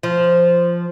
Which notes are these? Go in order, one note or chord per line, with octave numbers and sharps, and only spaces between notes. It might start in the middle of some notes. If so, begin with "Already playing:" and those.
F3